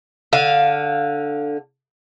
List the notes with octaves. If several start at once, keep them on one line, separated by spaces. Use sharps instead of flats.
D3 F5